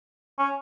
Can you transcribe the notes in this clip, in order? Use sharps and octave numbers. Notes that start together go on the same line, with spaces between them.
C#4